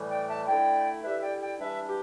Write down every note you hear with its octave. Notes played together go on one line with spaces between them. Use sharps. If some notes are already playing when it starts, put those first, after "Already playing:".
Already playing: A2 E3 G3
D5 G5
E5 A5
D3 A3 E4 D5 G5
D3 G3 E4 B4 E5
D5 G5
D5 G5
G2 E3 G3 D4 B4 E5
G4